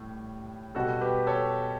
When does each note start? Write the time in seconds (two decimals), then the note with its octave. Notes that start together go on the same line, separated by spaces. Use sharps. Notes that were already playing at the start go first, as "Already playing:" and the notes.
Already playing: A2 G3
0.75 B2 G3 F#4 A4
1.01 G4 B4
1.27 A4 C#5